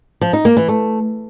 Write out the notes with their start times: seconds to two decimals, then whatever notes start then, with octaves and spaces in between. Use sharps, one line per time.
0.21 F3
0.33 D#4
0.45 A#3
0.57 E3
0.68 A3